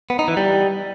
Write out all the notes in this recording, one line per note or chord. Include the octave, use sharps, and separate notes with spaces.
B3
D#4
E3
G3